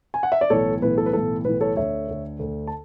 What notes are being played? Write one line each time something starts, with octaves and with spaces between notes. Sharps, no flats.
G#5
F#5
E5
D5
B1 A2 E3 A4 C#5
B1 A2 E3 B4
A4
B4
B1 A2 E3 A4
B1 A2 E3 B4
A4 C#5
D2 D3 C#5 E5
D2 D3
D2 D3
A5